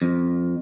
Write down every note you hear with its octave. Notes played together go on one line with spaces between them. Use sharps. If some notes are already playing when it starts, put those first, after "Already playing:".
F2